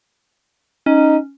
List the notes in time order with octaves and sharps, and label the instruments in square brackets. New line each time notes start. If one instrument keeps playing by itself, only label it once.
[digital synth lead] C#4 [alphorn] D#4